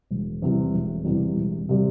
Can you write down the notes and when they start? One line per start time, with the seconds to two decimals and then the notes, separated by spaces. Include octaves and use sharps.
0.11 E1
0.42 E2 C3 G3
0.74 E1
1.05 E2 C3 G3
1.36 E1
1.69 C3 G3